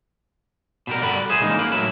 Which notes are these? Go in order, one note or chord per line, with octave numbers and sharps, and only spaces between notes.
B2 G3 A#4
G2 D3 D5 F#5 B5
G#4 C5 E5
C#3 E3 G#3 A#3 D#4
A#3 B4
A2 F#3 E4